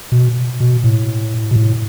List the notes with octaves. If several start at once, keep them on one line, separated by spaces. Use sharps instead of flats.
B2
B2
A2
B2
A2